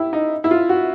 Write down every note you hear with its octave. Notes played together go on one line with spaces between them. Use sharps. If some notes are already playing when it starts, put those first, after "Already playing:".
Already playing: E4 G4
D#4
E4
F4
F#4